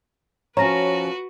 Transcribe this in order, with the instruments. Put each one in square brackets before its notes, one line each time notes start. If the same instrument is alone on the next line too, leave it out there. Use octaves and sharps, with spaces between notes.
[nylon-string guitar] F3 C#4 [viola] F#4 B4 [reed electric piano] C#5 [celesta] A#5 A#6